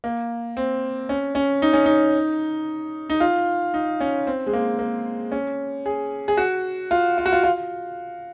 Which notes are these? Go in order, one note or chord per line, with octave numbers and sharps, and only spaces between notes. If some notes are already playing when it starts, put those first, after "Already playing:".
A#3
C4
C#4
C#4
D#4
C#4
D#4
D#4
F4
D#4
C#4
C4
G#3
A#3
A#3
C#4
G#4
G#4
F#4
F4
F4
F#4
F4
F4